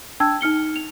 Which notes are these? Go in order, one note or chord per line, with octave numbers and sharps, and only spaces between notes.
D4 G5 A5 E6 G#6
D#4 F6 C#7 G7
F7